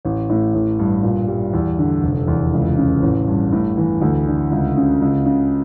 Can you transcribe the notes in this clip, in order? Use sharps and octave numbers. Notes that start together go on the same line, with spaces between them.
A1
A2
A1
G2
A#2
G3
E2
D3
F1
E2
C#2
C#3
A1
G2
A2
E3
D2
D3
C#2
C#3
C#2
C#3